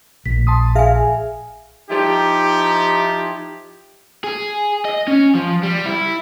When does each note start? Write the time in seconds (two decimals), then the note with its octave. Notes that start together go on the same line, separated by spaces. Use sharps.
0.26 A#1 B6
0.47 A5 C6 D#6
0.75 G#4 E5 F5 G#5
1.90 F3 D#4 E4 G4
4.24 G#4
4.85 D#5
5.07 C#4
5.35 F3
5.63 G3
5.86 E4